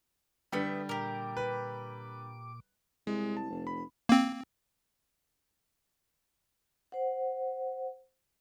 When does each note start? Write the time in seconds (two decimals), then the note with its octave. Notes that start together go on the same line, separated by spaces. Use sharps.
0.52 D3 G3 A3 B3 E5
0.89 A#2 G4 A#4 D6
1.37 B4
3.07 C2 G#3
3.37 A5
3.50 F1
3.67 B5
4.09 A#3 C4
6.92 C5 F#5